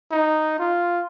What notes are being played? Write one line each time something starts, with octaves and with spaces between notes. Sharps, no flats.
D#4
F4